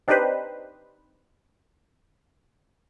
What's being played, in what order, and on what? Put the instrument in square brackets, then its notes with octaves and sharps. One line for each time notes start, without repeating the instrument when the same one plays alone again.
[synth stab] C4 D4 D#4 G4 B4 C5